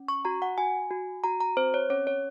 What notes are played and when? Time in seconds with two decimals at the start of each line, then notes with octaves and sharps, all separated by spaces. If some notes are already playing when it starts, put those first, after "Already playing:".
Already playing: C#4
0.08 C#6
0.25 F#4 A#5
0.42 F#5
0.58 F#4 G#5
0.91 F#4
1.24 F#4 A#5
1.41 A#5
1.57 C4 C5
1.74 C#5
1.90 C#4 C#5
2.07 C#5